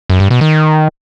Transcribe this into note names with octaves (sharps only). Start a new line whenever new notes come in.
F#2
G2
B2
D#3